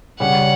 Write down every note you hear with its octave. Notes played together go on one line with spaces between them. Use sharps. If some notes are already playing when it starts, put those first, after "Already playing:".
C#3 G3 C#4 F#5